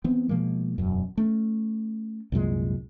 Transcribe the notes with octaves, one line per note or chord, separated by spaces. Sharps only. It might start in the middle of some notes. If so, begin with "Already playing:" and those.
E3 B3 C4
B2 F3 G#3 A#3
E1 F#2
A3 C#4
C2 F#2 A#2 G#3